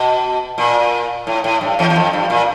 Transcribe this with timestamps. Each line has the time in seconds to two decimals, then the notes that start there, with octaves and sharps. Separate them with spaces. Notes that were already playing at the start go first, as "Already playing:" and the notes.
Already playing: B2
0.58 A#2
1.27 A2
1.44 A2
1.61 G2
1.79 E2
1.90 E2
1.96 F2
2.13 G2
2.30 A#2